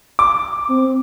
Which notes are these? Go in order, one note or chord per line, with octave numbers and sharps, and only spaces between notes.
D6
C4